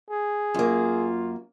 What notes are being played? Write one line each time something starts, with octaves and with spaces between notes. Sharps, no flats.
G#4
F#2 A#3 F4